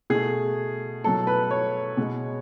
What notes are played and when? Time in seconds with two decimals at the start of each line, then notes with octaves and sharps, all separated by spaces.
0.10 B2 A3 G#4
1.04 B2 F#3 A3 A4
1.27 B4
1.51 C#5
1.97 B2 G#3